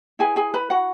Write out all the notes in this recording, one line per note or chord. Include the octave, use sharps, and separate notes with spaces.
E4 G#4 B4 G#5
G#4 G#5
B4 B5
F#4 F#5